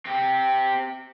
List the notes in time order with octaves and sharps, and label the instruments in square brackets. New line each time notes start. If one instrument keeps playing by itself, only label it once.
[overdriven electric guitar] C4 G4